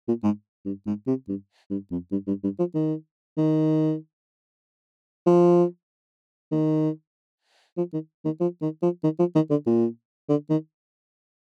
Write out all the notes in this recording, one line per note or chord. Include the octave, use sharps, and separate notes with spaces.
A#2
G#2
G2
G#2
C3
G2
G2
F2
G2
G2
G2
F3
D#3
D#3
F3
D#3
F3
D#3
D#3
F3
D#3
F3
D#3
F3
D#3
D3
A#2
D3
D#3